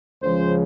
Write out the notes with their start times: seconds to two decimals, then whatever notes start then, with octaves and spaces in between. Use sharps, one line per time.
0.22 C#2 C#3 F3 C5